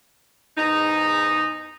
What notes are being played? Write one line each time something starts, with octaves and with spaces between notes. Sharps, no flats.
E2 G#2 D#4